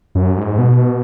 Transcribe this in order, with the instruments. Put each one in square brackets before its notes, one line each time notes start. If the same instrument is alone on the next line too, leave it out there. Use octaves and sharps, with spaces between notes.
[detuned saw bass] F#2
G#2
B2